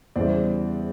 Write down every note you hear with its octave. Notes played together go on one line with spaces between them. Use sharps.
E2 C#3 E3 G3 C5 D5